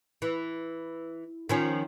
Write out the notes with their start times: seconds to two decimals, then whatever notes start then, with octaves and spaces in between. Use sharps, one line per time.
0.22 E3
1.49 D#3 F3 C#4